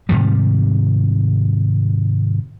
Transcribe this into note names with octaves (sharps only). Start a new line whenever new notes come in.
G#2 C3 D#3 G3